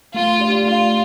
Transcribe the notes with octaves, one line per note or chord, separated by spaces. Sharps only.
A3 F4
D4 G4 D5
A3 F4